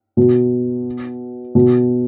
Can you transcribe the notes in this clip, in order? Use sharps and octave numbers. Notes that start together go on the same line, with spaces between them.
B2
B2